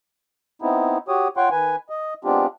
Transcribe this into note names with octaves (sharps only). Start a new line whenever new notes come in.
B3 C4 D#4 E4
F#4 G4 C#5 D#6
F4 C#5 F#5 G5 C6 C#6
D#3 B4 G#5
D#5
G#3 B3 C4 D4 F4 G4